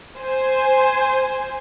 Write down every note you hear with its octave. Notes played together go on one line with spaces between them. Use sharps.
C5 G#5